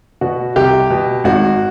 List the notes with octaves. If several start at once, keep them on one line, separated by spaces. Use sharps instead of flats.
B2 F#4
C2 G4
B2
G#1 F#4